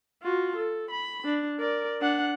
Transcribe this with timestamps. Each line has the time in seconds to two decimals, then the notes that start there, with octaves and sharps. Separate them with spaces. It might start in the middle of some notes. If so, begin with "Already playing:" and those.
0.23 F4 F#4
0.57 A4
0.91 B5
1.24 D4
1.60 A#4 D5
2.01 D4 F#5